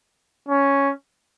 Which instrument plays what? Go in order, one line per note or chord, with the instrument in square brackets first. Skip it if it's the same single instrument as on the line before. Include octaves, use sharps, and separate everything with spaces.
[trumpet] C#4